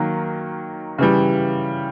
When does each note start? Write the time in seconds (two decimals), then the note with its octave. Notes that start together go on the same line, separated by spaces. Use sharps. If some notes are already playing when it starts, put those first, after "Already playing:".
Already playing: D#3 F#3 A#3
0.98 C#3 E3 G3